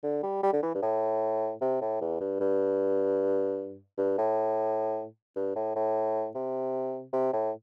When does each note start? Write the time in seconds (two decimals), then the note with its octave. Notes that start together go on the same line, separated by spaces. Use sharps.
0.03 D3
0.23 G3
0.43 G3
0.53 D3
0.63 E3
0.75 G2
0.82 A2
1.61 C3
1.81 A2
2.01 E2
2.20 G2
2.40 G2
3.98 G2
4.18 A2
5.36 G2
5.56 A2
5.76 A2
6.35 C3
7.13 C3
7.33 A2